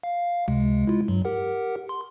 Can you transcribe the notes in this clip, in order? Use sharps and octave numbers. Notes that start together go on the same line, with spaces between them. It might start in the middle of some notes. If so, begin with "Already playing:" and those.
F5
C#2 C3 G#3
G#3 E4 F4
G2 F#3
G4 A#4 F#5
C6